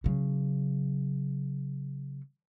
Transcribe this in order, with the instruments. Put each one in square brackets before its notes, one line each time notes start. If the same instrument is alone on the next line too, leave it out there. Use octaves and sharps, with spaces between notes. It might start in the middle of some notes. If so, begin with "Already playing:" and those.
[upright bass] C#3 F#3